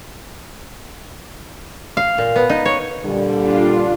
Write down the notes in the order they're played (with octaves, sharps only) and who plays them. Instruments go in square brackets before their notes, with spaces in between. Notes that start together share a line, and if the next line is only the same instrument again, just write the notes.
[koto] F5
A#2
B3
D#4
C#5
[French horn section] A#2 D3 G3
[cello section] D4 F4